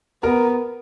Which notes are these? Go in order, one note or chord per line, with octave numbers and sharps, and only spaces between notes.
B3 A#4 A#5